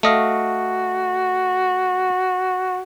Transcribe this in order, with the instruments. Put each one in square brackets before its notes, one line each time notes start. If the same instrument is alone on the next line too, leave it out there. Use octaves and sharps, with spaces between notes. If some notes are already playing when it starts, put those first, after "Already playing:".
[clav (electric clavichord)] A3 D#5 F5 [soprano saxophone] F#4